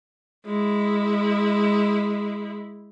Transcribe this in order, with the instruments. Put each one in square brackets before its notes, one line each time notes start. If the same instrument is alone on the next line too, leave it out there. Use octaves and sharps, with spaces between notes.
[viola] G#3 E4